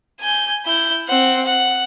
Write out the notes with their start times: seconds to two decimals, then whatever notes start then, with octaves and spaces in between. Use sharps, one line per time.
0.20 G#5 G6
0.66 E4 G6
1.08 C4 F#5
1.45 F#5